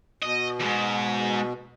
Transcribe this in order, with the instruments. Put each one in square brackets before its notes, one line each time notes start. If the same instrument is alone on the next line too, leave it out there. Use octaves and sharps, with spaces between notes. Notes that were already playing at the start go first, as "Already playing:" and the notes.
[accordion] B2 [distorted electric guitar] D#5
[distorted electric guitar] E2 G#2